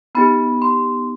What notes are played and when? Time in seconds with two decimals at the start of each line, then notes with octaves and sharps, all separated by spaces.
0.15 B3 D#4 G4 B5
0.62 C6